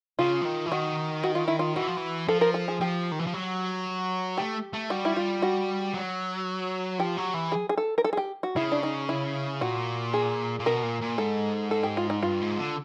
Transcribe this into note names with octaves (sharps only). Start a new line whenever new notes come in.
C#3 F4
E3
D#3
E3
D#3 F#4
F#4
F4
E4
F4
E3 F#4
F3
E3
F3 A4
A#4
A4
G#4
F3 G4
D#3
E3
F3
F#3
A3 G4
A3
G3 F#4
E4
F4
F#4
F#3
F3 G4
F#3
E3
G#4
G#4
A4
A#4
A4
G#4
G4
F#4
C#3 E4
D4
D#4
E4
A#2 F#4
G#4
A#2
B2 A#4
A#2
A#2
G#2 A4
A4
G4
F4
D#4
G2 F4
G#2
D3